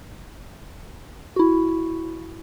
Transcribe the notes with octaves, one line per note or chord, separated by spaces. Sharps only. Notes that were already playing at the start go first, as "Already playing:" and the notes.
E4 F#4